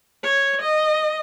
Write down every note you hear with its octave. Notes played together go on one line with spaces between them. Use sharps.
C#5
D#5